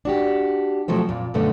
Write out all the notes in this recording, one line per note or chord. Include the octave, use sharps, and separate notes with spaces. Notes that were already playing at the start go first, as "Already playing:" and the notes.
D4 F#4 G4
B2 F3 F#3 A3 C4
F2 A#2
F#2 A#2 D3 A3 B3